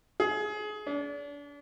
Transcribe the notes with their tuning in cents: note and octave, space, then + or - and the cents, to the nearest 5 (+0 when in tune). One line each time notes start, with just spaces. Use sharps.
G#4 +25
D4 -35